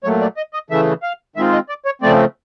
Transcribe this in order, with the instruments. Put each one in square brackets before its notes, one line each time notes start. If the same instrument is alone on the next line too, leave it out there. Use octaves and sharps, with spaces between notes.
[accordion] A#2 F#3 A3 C#5
D5
D#5
D#5
C#3 E3 A3 E5
F5
D#3 G#3 C4 F4 E5
D#5
D5
C#5
C#3 F3 A3 C4 D5